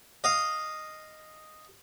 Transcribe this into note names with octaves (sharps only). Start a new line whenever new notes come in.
D#5 F5